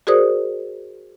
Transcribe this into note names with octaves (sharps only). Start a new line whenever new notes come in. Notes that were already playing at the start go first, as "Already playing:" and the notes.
F#4 G#4 A#4 C5 D5 D#6